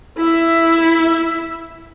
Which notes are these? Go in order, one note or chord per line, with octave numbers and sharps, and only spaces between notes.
E4 E5